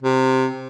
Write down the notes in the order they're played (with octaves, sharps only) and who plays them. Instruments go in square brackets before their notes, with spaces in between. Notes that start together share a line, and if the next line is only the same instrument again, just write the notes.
[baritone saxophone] C3